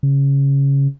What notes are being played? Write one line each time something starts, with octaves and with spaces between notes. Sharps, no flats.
C#3